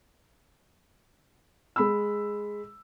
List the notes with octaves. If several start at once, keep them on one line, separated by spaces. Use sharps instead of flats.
G#3 B5 E6